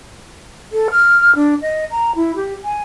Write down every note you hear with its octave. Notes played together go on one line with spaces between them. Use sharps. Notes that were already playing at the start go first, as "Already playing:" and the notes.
A4
F6
D4
D#5
A#5
E4
G4
G#5